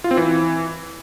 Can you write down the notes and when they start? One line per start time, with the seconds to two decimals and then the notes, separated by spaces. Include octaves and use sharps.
0.04 F4
0.11 C4
0.17 E3